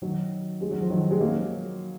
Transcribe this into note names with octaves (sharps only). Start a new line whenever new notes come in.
D#3 F#3
G#3
F#3
F3
D#3 F#3
G#3
F#3 A#3